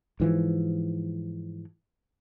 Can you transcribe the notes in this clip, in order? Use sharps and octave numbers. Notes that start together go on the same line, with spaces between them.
G#2 E3 F3